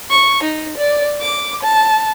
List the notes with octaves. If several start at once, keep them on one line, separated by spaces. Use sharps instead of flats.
C#6
D#4
D5
D6
A5